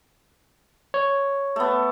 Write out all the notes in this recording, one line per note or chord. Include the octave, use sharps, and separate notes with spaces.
C#5
A3 B3